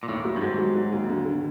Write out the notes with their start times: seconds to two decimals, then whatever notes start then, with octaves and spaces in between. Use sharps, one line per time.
0.03 A#2
0.08 D#2 A2
0.25 F#3
0.36 G2
0.41 G#2 F#3
0.58 F#3
0.75 F#3
0.92 D#2
1.10 D3
1.25 D3